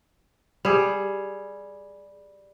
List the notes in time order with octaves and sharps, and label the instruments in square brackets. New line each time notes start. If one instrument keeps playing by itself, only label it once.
[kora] G3 G#4